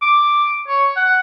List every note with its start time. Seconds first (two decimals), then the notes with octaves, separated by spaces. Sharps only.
0.02 D6
0.68 C#5
0.96 F#5